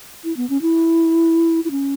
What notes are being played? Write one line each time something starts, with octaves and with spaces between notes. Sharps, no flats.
E4
B3
C#4
E4
E4
C#4